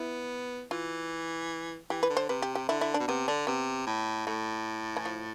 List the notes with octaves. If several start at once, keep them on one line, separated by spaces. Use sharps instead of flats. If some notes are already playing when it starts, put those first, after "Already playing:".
Already playing: B3 E4
E3 F4
E3 G4
B4
D3
C5
C3 B4
G4
G4
D3 E4
E4
D4
B2
C3 B3
D3 D4
C3 B3
A2
A2 A3
E3
F3